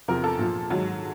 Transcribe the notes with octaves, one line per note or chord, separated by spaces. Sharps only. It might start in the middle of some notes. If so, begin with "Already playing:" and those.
E2 C3 F3 A#4
A4
A#2 F3
G#2 D#3 F#3